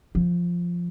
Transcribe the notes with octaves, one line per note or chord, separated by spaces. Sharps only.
F3